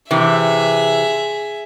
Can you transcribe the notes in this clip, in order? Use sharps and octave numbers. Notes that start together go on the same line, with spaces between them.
C3 E3 G#4 E5